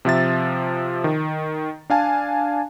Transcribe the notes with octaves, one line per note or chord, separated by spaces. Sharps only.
C3 F3 E5 A6
D#3
D4 F5 G#5 A5